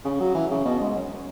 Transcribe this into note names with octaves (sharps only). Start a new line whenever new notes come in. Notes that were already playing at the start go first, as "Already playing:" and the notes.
C#3
F#3
E3
C#3
B2
G#2
F#2